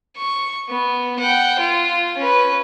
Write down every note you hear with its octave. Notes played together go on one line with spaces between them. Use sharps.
C#6
B3
F#5 G5
F4
C#4 B4